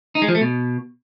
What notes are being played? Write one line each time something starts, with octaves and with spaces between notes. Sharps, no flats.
D#4
G#3
F3
A3
B2